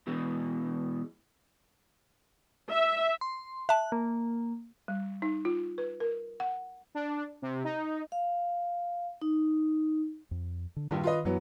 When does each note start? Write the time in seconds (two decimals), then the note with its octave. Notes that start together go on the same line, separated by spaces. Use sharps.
0.07 B2 E3 G#3
2.71 E5
3.21 C6
3.69 E5 A5 F#6
3.92 A#3
4.88 G3
5.22 D#4
5.45 F4
5.78 B4
6.00 A#4
6.40 F#5
6.95 D4
7.42 C3
7.64 D#4
8.12 F5
9.22 D#4
10.31 F2
10.76 D3
10.91 A#1 G2 D#3
11.03 F4 B4 D#5
11.25 F#2 E3 F#3 B3